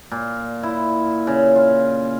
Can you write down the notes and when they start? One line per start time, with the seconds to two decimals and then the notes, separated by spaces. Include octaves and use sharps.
0.12 A#2
0.63 E4
1.27 C#3
1.55 F4